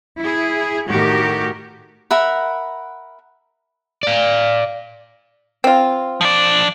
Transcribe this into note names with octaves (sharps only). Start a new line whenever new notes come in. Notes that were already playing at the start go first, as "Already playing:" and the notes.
E4 G#4
A2 D#3 F#4 G4 A#4
A#4 E5 F#5 B5
D5 F5
C4 F4
F3 D5